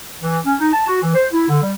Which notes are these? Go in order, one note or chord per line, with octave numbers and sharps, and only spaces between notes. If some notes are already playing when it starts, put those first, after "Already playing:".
E3
C#4
D#4
A5
F#4
E3
C5
E4
D3
G3